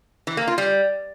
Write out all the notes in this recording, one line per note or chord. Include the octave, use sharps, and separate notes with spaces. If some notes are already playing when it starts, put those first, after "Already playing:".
E3
A#3
F4
G3